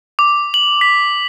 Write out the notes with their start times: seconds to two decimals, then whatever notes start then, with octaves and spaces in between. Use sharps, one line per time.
0.19 D6
0.54 F#7
0.81 B6